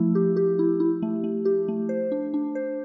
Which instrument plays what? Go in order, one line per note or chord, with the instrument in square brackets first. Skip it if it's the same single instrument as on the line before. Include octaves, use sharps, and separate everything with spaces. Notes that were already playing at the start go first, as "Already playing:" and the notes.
Already playing: [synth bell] F3 A3 E4
G4
G4
E4
E4
A3
A3
G4
A3
C5
D4
D4
C5